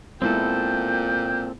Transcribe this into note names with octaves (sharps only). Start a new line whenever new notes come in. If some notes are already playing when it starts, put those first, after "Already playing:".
A#2 G#3 B3 C4 E4 A4 G5